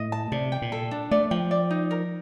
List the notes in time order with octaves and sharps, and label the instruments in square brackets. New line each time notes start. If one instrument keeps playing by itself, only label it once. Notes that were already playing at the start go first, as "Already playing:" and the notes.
Already playing: [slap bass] A2 [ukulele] D#5
[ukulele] A5
[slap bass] C3 [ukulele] D5
[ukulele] G5
[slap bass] A#2
[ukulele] A4
D4
[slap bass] A3 [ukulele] D5
[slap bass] F3 [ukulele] G5
[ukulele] D5
D#4
A#4